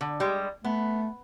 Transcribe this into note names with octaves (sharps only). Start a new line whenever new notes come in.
D3
G3 G#3
A3 B3